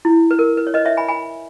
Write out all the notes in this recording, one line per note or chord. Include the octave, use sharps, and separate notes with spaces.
E4
B4
A#4
B4
C#5
B4 D#5
C#5 E5
G#5 B5
G#5 B5